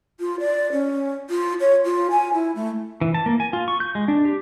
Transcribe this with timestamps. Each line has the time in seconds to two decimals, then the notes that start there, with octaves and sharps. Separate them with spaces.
0.20 F4
0.40 D5
0.72 C#4
1.30 F4
1.60 C#5
1.85 F4
2.11 G#5
2.33 E4
2.55 A3
3.01 E3
3.14 A5
3.26 A#3
3.40 G#5
3.53 F4
3.68 C#6
3.80 G6
3.95 G#3
4.08 D4
4.25 G4